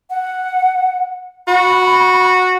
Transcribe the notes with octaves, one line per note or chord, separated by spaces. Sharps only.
F#5
F#4 B5